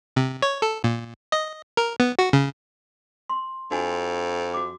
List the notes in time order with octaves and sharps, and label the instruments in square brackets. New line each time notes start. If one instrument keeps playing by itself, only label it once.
[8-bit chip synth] C3
C#5
A4
A#2
D#5
A#4
B3
F#4
C#3
[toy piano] C6
[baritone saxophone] F2 [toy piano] D4 F#4 G#5
[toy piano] F#4 D6